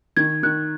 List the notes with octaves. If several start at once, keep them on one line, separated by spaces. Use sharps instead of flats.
D#3 G#6
D#3 F#6